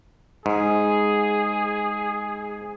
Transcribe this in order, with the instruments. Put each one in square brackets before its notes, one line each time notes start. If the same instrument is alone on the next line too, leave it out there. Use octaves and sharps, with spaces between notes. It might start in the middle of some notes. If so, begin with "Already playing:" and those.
[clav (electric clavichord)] G#2 [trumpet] G#4